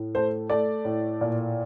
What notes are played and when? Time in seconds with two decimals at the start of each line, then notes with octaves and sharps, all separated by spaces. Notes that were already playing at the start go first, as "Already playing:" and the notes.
Already playing: A2
0.15 A3 C5
0.50 A3 D5
0.85 A2
1.21 A#2